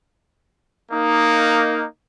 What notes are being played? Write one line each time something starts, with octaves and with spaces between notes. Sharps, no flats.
A#3 D#4